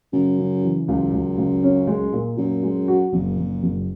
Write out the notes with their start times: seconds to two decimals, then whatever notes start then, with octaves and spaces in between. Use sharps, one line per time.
0.13 F#2 C#3
0.38 C#3
0.64 E3
0.88 C#2 F#2
1.13 C#2
1.38 C#2
1.63 C#4
1.87 G#3
2.13 A#2
2.37 F#2 A#2
2.63 G#3
2.88 F#4
3.13 F#1 A#2
3.38 F#1
3.63 F#1